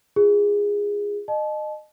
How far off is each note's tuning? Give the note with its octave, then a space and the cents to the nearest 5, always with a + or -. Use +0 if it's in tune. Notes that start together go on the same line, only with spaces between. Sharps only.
F4 -20 G#4 -15
D#5 -25 A5 -35